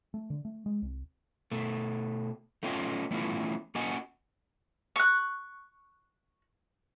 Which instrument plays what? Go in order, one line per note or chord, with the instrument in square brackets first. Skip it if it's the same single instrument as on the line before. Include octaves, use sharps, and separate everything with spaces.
[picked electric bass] A3
D3
A3
G#3
C2
[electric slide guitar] B2 A3
A3 B3 C#4 F4 D#5 G5
E3 A3 B3 C#4 E4 F4
A#3 C#4 F#4 D#5 F#5 G#5
[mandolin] C#6 F#6